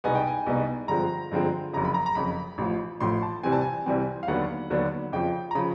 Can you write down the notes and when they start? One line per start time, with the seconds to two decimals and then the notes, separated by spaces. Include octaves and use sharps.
0.04 C2 B2 G#3 B3 D#4 G#5
0.15 G5
0.27 G#5
0.47 C2 B2 G#3 B3 D#4
0.88 G2 D3 F3 G#3 C4 A#5
1.31 G2 D3 F3 G#3 C4
1.73 F#1 F2 C#3 A#5
1.85 B5
1.94 A#5
2.06 A#5
2.15 F#1 F2 C#3 B5
2.58 A1 A2 F3
3.01 A1 A2 F3 C6
3.22 A5
3.43 C2 C3 E3 G3 C4 G#5
3.52 A5
3.61 G#5
3.86 C2 C3 E3 G3 C4
4.23 F5
4.28 D#2 D3 F#3 B3 D4 F#5
4.70 D#2 D3 F#3 B3 D4
5.12 F2 C#3 F3 G5
5.51 A#5
5.55 C#3 F3 B5